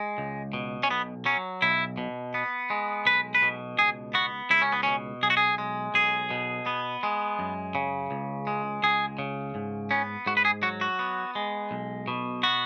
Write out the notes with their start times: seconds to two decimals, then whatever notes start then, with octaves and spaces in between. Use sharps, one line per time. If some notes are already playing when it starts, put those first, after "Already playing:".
Already playing: G#3
0.18 C#2
0.53 B2
0.83 C#4
0.90 B1 B3
1.26 F#3 C#4
1.62 B1 E4
1.98 B2
2.34 B3
2.70 G#3
3.06 B1 B4
3.35 B4
3.42 B2
3.78 C#2 G#4
4.14 B3 F#4
4.50 C#2 E4
4.62 C#4
4.72 B3
4.83 B2 C#4
5.23 B1 G#4
5.30 F#4
5.37 G#4
5.58 G#3
5.94 B1 G#4
6.31 B2
6.66 B3
7.03 G#3
7.39 F#2
7.75 C#3
8.11 C#2
8.47 G#3
8.83 C#2 G#4
9.19 C#3
9.55 G#2
9.91 B3 C#4
10.26 G#2 F#4
10.37 B4
10.45 G#4
10.63 F#3 F#4
10.81 F#4
10.99 B3
11.35 G#3
11.71 B1
12.08 B2
12.43 B3 F#4